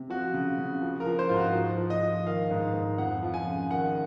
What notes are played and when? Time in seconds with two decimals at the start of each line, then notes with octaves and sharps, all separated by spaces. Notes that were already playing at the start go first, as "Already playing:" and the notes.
Already playing: C3
0.10 F3 F#4
0.34 C#3
0.58 C#3
0.82 F3
1.00 A#4
1.06 F3
1.19 C5
1.29 G#2 F4
1.36 F#4
1.54 F3
1.78 F3
1.90 D#5
2.02 F3
2.26 D#3 F5
2.51 G#2
2.74 G#2
2.98 F2 F#5
3.23 F3
3.34 G#5
3.47 C#3
3.70 D#3 F#5